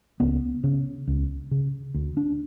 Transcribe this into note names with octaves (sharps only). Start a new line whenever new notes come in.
C#2 B3
C#3
C#2
C#3
D2
D4